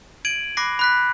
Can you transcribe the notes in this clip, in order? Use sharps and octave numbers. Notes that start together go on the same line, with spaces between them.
G#6 D7 D#7 F#7
B5 D6 F#6 A#6 C7
B5 F#6 B6